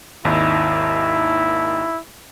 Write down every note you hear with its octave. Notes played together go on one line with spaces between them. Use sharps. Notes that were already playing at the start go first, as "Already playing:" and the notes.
G#1 D#2 D#4 E4